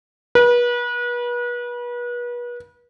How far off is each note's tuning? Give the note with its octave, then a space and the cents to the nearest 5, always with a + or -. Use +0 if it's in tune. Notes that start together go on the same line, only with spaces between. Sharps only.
B4 -35